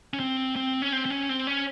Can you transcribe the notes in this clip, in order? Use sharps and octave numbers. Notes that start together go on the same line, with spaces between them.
C#4
C4
C4
C#4
C4
C4
C#4
C4
C#4